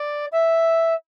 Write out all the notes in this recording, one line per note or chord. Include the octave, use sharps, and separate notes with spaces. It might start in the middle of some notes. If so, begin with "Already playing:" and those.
Already playing: D5
E5